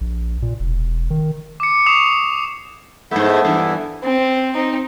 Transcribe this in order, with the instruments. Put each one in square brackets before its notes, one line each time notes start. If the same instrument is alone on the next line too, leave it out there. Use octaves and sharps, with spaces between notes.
[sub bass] A#1
A#2
E1
D#3
[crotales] D6 C#7
C#6 D#6 C7 E7 F7
[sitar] G#2 A3 [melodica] B3 E4 E5
[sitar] G2 E3
[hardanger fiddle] C4
C4 D#4